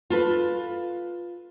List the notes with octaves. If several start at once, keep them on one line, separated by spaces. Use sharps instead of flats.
F4 A4 B4